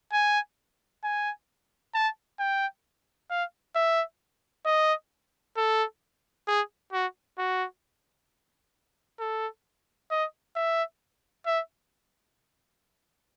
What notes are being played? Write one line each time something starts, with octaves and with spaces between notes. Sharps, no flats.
G#5
G#5
A5
G5
F5
E5
D#5
A4
G#4
F#4
F#4
A4
D#5
E5
E5